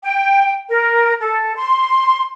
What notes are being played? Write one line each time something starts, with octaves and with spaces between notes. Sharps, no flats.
G5
A#4
A4
C6